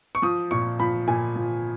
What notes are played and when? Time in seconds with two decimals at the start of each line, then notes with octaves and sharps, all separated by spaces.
0.15 C#6
0.22 F3 D#6
0.51 A#2 C#6
0.80 F3 B5
1.07 A#2 G#5
1.36 F3